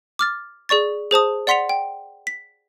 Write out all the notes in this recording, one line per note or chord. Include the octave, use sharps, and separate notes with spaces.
D6 F6 A6
G#4 D5 C#6 A6
G#4 C5 A5 D#6
D5 F#5 C6 B6 C#7 F7
G5
B6